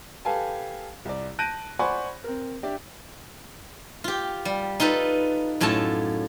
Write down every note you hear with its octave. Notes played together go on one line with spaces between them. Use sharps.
G4 A4 B4 F5 G#5 A5
C2 D5
A5 F#6 G6 A#6 D7 D#7
C5 D5 F#5 G#5 B5 C#6
C4 A#4
D4 G4 D5 E5
F4 G4
G3
D#4 F4 A4 B4
F#2 A2 F4 A4 A5